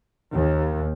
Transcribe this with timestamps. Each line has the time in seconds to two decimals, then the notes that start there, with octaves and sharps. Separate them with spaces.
0.33 D#2